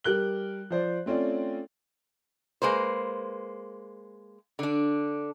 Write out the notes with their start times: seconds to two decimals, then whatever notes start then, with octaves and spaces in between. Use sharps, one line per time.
0.04 G3 G4 A#4 F#6 G7
0.70 F3 C5 D5
1.06 A3 C4 C#4 F4 D5
2.62 G#3 A#3 B4 C5
4.59 D3 D4